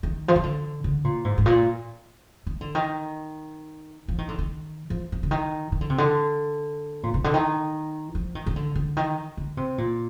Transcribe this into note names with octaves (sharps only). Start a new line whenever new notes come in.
D#3
F3
D#3
D3
D3
A#2
G#2
G#2
A#2
D#3
D3
D#3
F3
D#3
D3
D#3
F3
F3
D3
D#3
D#3
D3
C3
D3
A#2
C3
D3
D#3
F3
D#3
D#3
D3
D3
D#3
D3
C3
A#2